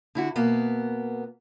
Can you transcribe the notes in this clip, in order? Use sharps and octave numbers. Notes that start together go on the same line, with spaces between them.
D3 E4 F#4
B2 A#3 B3